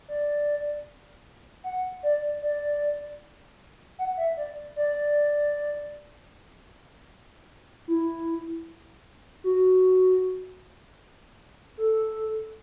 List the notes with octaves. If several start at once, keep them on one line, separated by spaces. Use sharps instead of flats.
D5
F#5
D5
D5
F#5
E5
D5
D5
E4
F#4
A4